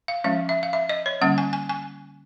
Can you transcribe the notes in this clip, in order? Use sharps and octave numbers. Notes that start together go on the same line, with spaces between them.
F5
F3 G#3 C#4 F5
E5
F5
E5
D#5
C#5
D3 G3 A#3 C#4 F#5
G#5
G#5
G#5